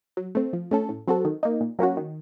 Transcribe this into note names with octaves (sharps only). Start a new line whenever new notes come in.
F#3
A3 C4
F3
A3 C#4 A4
A2
F#3 C4 F#4 A4
D#3
A#3 D#4
A#2
F#3 A#3 C#4 F#4
D#3